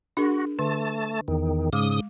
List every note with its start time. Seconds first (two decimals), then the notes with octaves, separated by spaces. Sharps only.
0.17 D4 F#4 G#4 A#4
0.59 D3 A3 A5
1.28 E2 D#3
1.73 G#2 C#3 G#3 D6 D#6